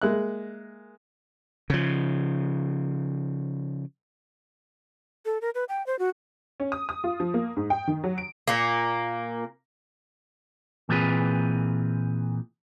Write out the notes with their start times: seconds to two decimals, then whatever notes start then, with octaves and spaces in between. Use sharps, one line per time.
0.02 G#3 A#3 E5 F#6
1.70 C#3 F3
5.25 A4
5.42 A#4
5.55 B4
5.69 G5
5.87 C5
5.99 F#4
6.60 C#4
6.72 D#6
6.89 D#6
7.04 F4
7.20 F3
7.34 A#3
7.56 G#2
7.70 G5
7.88 D#3
8.04 F#3
8.18 D7
8.47 A#2 A#3
10.89 A#2 E3 C4 F4 G#4 B4